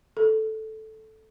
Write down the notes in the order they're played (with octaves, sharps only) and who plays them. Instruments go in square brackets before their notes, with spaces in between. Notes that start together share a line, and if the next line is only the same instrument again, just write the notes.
[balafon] A4